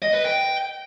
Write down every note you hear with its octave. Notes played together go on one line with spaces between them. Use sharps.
D#5
B4
G5